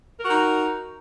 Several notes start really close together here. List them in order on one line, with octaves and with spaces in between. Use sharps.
A#4 F#4 D#4